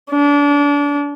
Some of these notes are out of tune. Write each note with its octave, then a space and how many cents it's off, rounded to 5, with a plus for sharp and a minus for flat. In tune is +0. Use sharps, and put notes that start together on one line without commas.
D4 -30